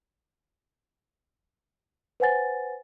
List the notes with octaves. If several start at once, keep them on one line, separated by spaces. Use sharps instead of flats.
B4 C5 F#5 G#5 A6